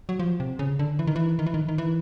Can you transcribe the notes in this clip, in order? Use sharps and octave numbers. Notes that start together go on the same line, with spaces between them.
F#3
F3
C3
C#3
D3
E3
D#3
E3
D#3
E3
D#3
D#3
E3